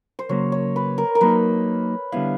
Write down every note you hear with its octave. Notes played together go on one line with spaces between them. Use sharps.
C5
C#3 F#3 A#3 C#5
C#5
B4
A#4
A#4
F#3 A#3 D#4 B4
D3 G3 B3 E4 F5